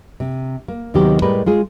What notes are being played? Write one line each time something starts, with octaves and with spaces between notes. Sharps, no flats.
C3
A#3
D#2 C3 D#3 F#3 B3 G4
A2 G3 G#3 G4 A#4 B4
G#3 F4 G#4